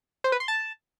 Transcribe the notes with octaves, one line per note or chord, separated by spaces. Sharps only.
C5
B4
C6
A5